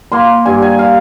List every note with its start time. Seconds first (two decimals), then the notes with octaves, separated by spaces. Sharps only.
0.12 A#3 C6
0.45 G2 G#5
0.62 G#5
0.79 F5